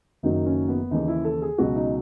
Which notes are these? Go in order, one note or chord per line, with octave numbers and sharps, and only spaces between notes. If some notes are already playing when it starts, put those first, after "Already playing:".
F#1 F#2 D#3 F#3 D#4
C#4
B3
D#2 C#3 E3 D#4
E4
A4
G#4
C#2 B2 F#3 F#4
D#4